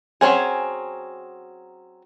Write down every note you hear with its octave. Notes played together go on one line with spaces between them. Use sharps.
F#3 C4 C#4 G#4